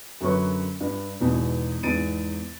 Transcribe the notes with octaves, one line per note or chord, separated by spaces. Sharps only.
F#2 D3 F#3 C#4 B4 C#6
G2
E2 G#2 B2
E2 G#2 A6 D7 D#7